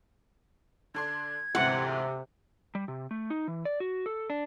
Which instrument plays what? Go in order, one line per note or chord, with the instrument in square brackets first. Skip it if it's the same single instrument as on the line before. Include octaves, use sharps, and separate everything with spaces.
[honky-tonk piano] D3 D4 C6 [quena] G#6
[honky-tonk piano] D2 G#2 E3 [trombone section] C3 [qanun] F#5
[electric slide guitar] G3
C3
A3
D#4
E3
D5
F#4
A4
D4